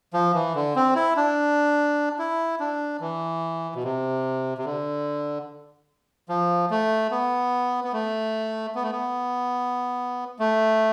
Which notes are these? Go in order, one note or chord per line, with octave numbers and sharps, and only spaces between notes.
F3
E3
D3
C4
E4
D4
E4
D4
E3
B2
C3
C3
D3
F3
A3
B3
B3
A3
B3
A3
B3
A3